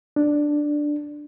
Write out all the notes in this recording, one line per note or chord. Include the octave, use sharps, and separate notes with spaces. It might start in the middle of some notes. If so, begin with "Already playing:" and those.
D4